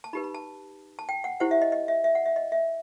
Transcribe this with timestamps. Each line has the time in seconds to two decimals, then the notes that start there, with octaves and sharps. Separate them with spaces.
0.04 A5
0.13 D#4 G4 B4 B5
0.24 B5
0.35 A5
0.99 A5
1.09 G5
1.24 F#5
1.40 E4 G4 C5 F#5
1.51 E5
1.62 D#5
1.72 D#5
1.88 E5
2.04 E5
2.15 F#5
2.26 E5
2.36 D#5
2.52 E5